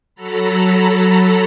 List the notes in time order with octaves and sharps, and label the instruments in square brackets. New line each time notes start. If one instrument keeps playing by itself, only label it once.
[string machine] F#3 A4 A#5 B5